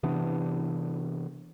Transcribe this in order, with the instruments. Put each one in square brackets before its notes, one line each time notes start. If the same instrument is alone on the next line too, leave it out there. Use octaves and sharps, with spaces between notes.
[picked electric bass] C3 E3 B3 D4